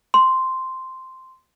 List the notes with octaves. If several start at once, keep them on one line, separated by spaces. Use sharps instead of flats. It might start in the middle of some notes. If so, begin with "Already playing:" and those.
C6